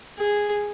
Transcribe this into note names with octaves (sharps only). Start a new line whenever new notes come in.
G#4